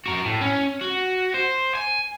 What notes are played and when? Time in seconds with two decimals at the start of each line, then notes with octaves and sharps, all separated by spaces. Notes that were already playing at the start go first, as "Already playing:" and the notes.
0.06 F#4 A#4
0.25 A2
0.41 C#4
0.81 F#4
1.34 C5
1.75 G#5